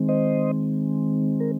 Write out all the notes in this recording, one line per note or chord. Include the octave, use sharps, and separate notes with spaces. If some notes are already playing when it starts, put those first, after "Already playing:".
Already playing: D#3 G#3 C4
C5 D#5
A#4